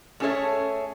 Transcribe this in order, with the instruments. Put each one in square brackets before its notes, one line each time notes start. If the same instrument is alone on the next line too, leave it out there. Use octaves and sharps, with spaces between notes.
[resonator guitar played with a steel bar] A3 C#4 G#4 A4 C#5 E5